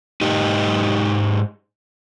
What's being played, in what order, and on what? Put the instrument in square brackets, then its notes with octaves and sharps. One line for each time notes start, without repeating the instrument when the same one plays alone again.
[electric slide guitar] G#2 D#4 G4